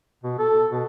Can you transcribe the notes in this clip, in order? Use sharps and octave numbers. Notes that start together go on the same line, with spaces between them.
B2
A4
B2